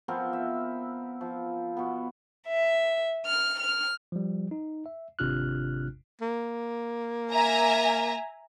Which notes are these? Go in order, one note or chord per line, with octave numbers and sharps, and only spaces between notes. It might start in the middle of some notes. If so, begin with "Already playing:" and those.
F3 B3 C4 A#4
E5
F3
B2 B3
E5
F6
F6
F3 G3
D#4
E5
G#1 C3 D4 F4 F6 F#6
A#3
E5 G#5 A#5